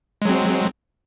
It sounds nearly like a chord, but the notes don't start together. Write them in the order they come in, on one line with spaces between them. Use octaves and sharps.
G#3 F#3 C4